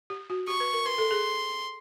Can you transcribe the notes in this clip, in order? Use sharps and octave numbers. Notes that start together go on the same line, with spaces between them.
G4
F#4
G4 C#6
B4
A#4
B4 C6
A4
G#4